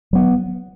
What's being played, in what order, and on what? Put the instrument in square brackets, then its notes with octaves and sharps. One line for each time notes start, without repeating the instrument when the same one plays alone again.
[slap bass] F#3 B3